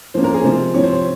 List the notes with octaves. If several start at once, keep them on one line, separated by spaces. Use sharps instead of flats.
F3 A#3 C#4 C5
A#4
G#4
C3 F3 G#3 C5
C3 F3 C4 C#5
C5
C#5